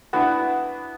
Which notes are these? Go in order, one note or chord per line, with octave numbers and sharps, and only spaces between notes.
B3 D4 E4 F#4